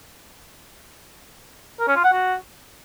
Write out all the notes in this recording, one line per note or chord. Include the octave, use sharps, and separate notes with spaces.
A#4
C#4
F4
F#5
F#4